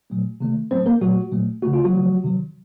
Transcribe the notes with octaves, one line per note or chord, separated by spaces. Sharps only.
A#2 F#3 A3
C3 D#3 A3
A2 F#3 A3 C4 C5
A#3 A#4
A#2 F#3 A3 F#4
A#2 F#3 A3
C#3 A3 F#4
F4
F#3 F#4
C#3 F3 A3
C3 D#3 F#3